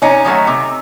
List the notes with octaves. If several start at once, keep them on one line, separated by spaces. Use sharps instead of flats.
C3 C#4 D#4
D#3 F#3 A3
C3